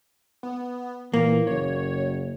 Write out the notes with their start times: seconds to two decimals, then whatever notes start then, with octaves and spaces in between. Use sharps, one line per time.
0.43 B3
1.14 A#2 E3 A#3
1.47 F#1 C#5